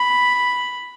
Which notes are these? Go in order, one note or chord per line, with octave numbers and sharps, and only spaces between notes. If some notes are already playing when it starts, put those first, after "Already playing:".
Already playing: B5